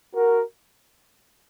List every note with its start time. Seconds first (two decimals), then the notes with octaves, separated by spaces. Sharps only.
0.15 F#4 A#4